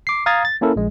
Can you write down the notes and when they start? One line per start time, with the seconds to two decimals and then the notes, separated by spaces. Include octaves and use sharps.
0.07 D6 C7
0.26 F5 A#5 D#6 G#6 A6
0.45 A6
0.61 A#3 C#4 E4 A4 A#4
0.76 A#1 G#3